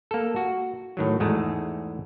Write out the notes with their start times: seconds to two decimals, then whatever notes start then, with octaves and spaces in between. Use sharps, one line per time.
0.11 A#3 A4
0.36 F#4
0.97 A2 D#3 F#3
1.20 E2 G#2 G#3 A3